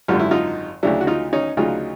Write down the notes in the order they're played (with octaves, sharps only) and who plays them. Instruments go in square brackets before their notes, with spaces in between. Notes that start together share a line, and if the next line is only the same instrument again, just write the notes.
[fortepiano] G#1 F#2 D3 G3 F4
E4
D#4 F4
D2 C#3 F#3 D4 E4
F#4
D#4 F4
C#4 D#4
D2 C#3 F#3 D#4 F4